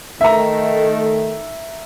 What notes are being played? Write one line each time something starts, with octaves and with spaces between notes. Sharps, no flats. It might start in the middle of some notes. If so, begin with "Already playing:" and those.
D#3 A3 E5 A#5